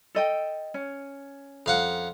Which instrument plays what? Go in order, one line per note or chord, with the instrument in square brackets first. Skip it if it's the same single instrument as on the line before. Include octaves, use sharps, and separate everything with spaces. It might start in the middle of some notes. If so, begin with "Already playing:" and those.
[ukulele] A4 D#5 G5
C#4
[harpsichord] F2 F5 F#5